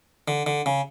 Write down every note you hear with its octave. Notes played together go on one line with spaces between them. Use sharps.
D3
D3
C#3